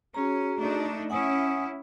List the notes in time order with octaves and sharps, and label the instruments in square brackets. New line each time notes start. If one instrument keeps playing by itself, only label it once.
[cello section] C#4 [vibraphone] F#4 G#4 A#5
[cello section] A3 D4 D#4
[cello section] C#4 E4 [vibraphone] F#5 G#5 D#6